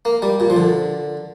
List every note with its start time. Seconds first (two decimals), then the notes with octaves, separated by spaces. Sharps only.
0.05 A#3
0.22 G3
0.40 A#2
0.50 F3
0.56 D3